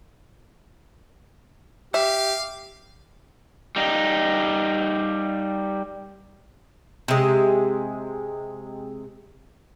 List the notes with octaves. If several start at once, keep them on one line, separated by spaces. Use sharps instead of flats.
G4 E5 F5
G3 D#4
C3 G#3